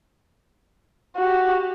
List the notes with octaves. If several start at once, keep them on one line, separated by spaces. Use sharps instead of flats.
F#4 G4